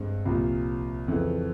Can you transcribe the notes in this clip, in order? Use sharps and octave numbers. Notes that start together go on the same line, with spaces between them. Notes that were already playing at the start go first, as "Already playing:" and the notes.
Already playing: G2 G#3 C4
C2 A#2 F3
F2 C#3 E3